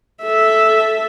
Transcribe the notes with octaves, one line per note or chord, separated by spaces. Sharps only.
A4 E5